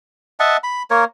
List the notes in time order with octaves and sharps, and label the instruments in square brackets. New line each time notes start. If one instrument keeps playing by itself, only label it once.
[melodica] D#5 E5 F#5 A5
B5
A#3 A#4 C#5